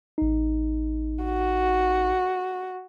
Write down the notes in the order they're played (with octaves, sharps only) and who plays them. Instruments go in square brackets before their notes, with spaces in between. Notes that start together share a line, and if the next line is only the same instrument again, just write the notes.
[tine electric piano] A1 D#4
[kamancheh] F#4